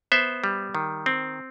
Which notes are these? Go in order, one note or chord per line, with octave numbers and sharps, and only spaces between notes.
B3 C5 E5
G3
D#3
C4